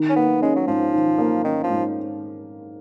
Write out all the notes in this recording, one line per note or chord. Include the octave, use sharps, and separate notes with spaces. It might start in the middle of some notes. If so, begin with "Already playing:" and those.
Already playing: D#3
C#4
A#3 B3
G#3 C#4
F#3
G#2 F3
D#3
A#3
D#3 C#4
F3
G#2